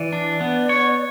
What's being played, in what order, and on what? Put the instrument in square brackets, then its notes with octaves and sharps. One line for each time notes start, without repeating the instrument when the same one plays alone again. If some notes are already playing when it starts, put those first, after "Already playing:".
Already playing: [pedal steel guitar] E3 [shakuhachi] D5
[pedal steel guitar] D4
B3
C#5